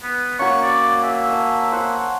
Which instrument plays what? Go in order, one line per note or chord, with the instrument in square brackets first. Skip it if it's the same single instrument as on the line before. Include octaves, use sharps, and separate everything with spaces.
[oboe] B3
[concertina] A#3 [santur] C#4 F#4 [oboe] C#6
[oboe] D5
[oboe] E5 [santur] G#5
[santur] G#5 A5
C5 F#5